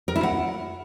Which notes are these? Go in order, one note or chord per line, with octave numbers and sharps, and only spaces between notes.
A#4
E4
F#5